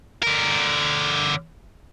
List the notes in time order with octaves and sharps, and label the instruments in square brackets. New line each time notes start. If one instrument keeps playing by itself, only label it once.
[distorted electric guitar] D3 A#4